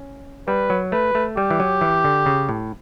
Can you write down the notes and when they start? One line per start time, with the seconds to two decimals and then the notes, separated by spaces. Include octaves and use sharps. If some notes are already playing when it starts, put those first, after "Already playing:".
Already playing: C#4
0.47 G3 B4
0.70 F#3
0.92 A3 B4
1.15 A3
1.36 G3 G4
1.51 E3
1.60 F#3
1.81 E3
2.04 D3
2.26 C#3
2.49 A2